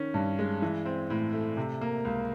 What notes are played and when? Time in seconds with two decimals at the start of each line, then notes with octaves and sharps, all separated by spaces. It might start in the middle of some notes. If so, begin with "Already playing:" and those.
Already playing: D#3 C#4
0.14 G2
0.39 G#3
0.62 E3
0.85 C4
1.10 A2
1.33 A3
1.57 C3
1.81 A#3
2.05 C#2